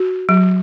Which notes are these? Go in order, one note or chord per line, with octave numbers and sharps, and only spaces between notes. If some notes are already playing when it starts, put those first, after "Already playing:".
Already playing: F#4
F#3